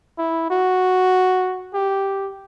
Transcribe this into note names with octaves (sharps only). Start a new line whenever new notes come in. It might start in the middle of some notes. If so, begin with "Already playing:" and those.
E4
F#4
G4